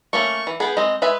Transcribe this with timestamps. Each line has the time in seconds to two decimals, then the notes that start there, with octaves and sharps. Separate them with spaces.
0.13 A3 A#3 C#4 C#6
0.47 E3
0.60 B3 G#4 B4 G5
0.77 G#3 C4 D#5
1.02 G#3 B4 E5 G#5